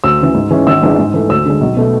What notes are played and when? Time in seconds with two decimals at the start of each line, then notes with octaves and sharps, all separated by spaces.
0.04 D2 E6
0.19 C#3 E3
0.35 G#2
0.50 E3 G#3 C#4
0.67 G#1 E6
0.82 G#2 E3 G#3 D4
0.99 G#2
1.14 E3 A3
1.29 D2 E6
1.46 D3 G#3
1.61 B1
1.77 B2 A3